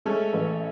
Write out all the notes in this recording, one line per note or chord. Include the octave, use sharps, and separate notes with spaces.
G#3 A3 C#4
A1